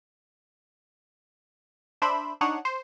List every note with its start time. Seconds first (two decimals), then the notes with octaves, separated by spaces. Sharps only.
2.02 D4 C5 E5 B5
2.41 D4 D#4 C#5 F#5
2.65 C5